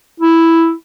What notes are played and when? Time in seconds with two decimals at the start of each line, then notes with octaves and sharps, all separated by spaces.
0.20 E4